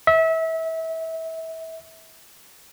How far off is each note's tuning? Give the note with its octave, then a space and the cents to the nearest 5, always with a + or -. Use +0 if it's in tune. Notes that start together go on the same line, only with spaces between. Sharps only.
E5 -25